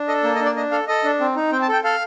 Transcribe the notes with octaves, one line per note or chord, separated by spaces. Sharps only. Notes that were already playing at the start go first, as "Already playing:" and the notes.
Already playing: D4
A4 D#5
A#3
D#5
D4
D5
D4 D#5
A4 F5
A4 D#5
D4
C4
D#4
C4 G5
A5
A4 G5
A4 F5